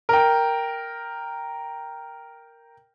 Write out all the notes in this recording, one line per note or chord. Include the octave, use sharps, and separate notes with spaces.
A#4 G5